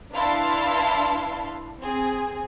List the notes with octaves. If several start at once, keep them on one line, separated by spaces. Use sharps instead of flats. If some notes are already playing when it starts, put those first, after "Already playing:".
D4 E4 B4 F5 A5 C6
C4 G#4